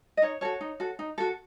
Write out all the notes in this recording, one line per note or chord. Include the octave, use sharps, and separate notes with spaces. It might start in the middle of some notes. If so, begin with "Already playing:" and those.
D#5
D#4 C#5
F#4 A4 C#5
D#4
F#4 A4
D#4
F#4 A4